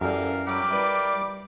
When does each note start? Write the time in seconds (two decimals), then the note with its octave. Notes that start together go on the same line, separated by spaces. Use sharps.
0.01 F#2 E3 G3 A4 A#4 F5
0.47 F#3 A#4 G5 B5 D6
0.70 G3 E4 B4